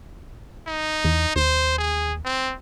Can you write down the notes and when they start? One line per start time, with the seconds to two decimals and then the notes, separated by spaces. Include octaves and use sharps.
0.67 D#4
1.04 E2
1.36 D#2 C5
1.78 G#4
2.25 C4